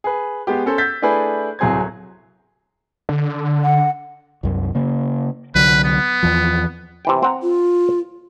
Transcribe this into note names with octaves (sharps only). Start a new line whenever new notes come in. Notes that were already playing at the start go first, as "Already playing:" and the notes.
G#4 B4
G#3 B3 G4
C#4 A4 C5
E6 G6 A6 B6
A3 D4 E4 G#4 B4
D1 C2 F#3 G#4 C5 G#6
D3
F#5
C2 F#2
C#3 A#3
C2 D3 F#3 B4
B3
E2 E3 F3
C3 E3 G5
C4 F#5 A#5
F4